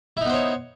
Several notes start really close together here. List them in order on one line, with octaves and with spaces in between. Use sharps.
E4 D#4 B3 C5 C#5